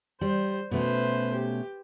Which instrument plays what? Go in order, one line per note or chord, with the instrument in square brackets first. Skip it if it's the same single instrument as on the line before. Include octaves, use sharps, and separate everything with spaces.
[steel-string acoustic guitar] G3 [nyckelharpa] C5
[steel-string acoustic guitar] B2 A3 C#4 [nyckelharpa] B4 C5
[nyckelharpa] G4